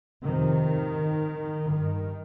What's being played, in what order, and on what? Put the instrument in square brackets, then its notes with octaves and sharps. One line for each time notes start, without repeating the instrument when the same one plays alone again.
[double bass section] F2 C3 D#3
G2 D#3